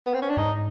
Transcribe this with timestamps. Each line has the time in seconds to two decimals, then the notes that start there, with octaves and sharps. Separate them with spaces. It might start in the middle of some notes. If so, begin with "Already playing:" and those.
0.06 B3
0.14 C4
0.22 C#4
0.30 D4
0.37 G#2 D#4